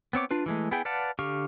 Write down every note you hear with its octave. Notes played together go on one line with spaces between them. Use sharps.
B3 C4 C#5 D6
D4 F4 B4
E3 G#3 A3
B3 E4 G#4 G5
B4 D5 F5 F#5 A5
D3 G4 F5 C#6